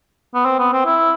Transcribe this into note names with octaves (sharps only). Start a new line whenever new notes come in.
B3
C4
B3
C4
E4